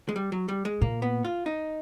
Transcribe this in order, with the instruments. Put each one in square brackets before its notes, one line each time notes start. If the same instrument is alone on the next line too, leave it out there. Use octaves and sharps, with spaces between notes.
[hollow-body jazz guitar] G#3
G3
F#3
G3
G#3
[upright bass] A#2 [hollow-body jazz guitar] A#3
[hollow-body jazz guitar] B3
F4
D#4